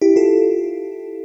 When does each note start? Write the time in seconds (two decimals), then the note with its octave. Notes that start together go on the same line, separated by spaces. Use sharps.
0.01 E4 G4
0.16 F4 A4